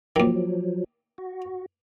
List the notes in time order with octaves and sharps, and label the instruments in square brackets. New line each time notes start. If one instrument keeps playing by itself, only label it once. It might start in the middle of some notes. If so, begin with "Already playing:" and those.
[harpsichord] D#2 D#3 [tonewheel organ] F3 F#3
[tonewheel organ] F#4